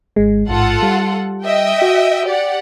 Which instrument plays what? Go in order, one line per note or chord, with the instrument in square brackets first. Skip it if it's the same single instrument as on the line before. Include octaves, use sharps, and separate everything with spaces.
[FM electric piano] G#1 G#3
[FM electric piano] A1 G#2 [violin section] F4 A4 F#5
[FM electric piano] G3
[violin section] D#5 E5 G5
[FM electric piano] F#4
[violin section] G4 D5 F#5